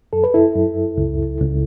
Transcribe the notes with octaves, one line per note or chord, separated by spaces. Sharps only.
F#2 A4
B4
E4 A4
F#2
C#2
C#2